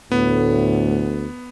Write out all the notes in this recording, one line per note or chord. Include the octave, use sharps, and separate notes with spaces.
D2 A2 B3